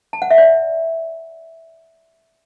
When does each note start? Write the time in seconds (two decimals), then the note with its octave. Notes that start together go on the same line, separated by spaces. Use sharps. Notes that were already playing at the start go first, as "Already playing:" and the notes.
0.13 A5
0.22 F#5
0.31 E5
0.38 D5